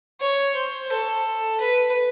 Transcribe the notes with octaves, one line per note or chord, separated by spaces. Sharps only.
C#5
C5
A4
B4